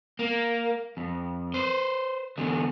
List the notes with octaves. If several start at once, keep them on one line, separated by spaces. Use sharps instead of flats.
A#3
F2
B4 C5
E2 D3